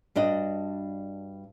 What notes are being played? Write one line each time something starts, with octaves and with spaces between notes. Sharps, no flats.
G2 D4 F#4 D#5